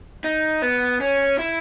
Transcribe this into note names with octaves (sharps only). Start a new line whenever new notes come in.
D#4
B3
C#4
E4